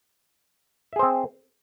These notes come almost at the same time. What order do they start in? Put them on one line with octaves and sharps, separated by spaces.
E5 G#4 C5 C4